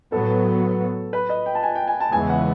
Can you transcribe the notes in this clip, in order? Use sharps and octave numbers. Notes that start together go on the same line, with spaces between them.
A2 F#3 B3 A4
B4
D#5
G5
A5
G#5
G5
G#5
A5
E2 C#3 E3 G#3 B3 G#5
F#5